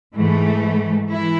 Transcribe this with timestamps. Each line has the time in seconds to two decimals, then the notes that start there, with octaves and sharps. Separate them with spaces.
0.15 G#2 E3 A3
1.10 E3 E4